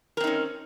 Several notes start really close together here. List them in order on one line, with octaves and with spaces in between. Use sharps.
A#4 C4 D#4 C#4